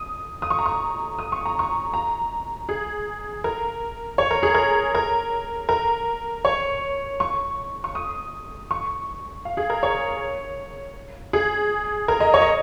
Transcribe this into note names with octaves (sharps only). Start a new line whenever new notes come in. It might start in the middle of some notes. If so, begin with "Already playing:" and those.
Already playing: D#6
D#6
C#6
A#5
C#6
D#6
C#6
A#5
C#6
A#5
G#4
A#4
C#5
A#4
G#4
A#4
A#4
A#4
C#5
C#6
C#6
D#6
C#6
F5
G#4
A#4
C#5
G#4
A#4
D#5
C#5
D#5